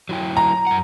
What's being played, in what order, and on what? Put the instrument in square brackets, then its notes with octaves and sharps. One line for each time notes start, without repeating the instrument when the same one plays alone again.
[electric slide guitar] F#3 E4 G5
[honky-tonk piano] A#5
[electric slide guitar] F#2 F#5